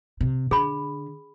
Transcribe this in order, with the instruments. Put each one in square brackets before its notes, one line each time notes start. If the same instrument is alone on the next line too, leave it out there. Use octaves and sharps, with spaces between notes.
[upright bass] C3
[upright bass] D3 [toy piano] G#4 B5